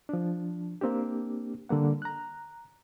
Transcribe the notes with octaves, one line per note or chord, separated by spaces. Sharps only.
F3 D4
A#3 C4 D4 G4
D3 G3 A#3 F#5
A#5 F#6